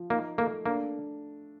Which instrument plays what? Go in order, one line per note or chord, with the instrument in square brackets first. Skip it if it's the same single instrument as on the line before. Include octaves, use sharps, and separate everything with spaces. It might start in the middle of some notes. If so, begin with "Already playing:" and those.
Already playing: [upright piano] F3
[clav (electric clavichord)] A#3 [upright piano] D#4
[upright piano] A3 [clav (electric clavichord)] A#3
[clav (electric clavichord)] A#3 [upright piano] D4